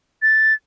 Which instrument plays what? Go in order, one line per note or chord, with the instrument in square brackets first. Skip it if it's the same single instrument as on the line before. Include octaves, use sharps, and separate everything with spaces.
[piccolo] A6